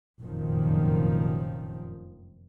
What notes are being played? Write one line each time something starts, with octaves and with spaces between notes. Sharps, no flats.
F1 F#2 A#2 D#3 F3